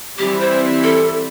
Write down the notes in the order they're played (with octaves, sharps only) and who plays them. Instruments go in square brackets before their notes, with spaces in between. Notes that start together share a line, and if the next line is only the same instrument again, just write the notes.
[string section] E3 G3 C4 E4 [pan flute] G4
[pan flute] C5
A4